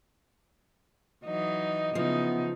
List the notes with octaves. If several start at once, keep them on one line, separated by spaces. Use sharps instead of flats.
E3 F#3 D#4 D#5
C#3 E3 F3 B3 D#4